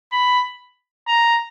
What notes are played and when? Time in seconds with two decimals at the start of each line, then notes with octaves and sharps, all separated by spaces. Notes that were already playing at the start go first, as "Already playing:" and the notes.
0.12 B5
1.07 A#5